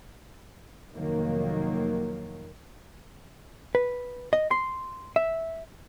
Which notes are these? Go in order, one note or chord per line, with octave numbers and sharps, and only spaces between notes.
F1 D#3 F#3 A#3
B4
D#5
C6
E5